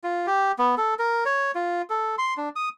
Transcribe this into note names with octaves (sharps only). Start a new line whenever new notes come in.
F4
G4
B3
A4
A#4
C#5
F4
A4
C6
D4
D#6